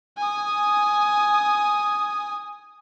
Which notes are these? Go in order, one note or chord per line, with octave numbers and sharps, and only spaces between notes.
G#5 D#6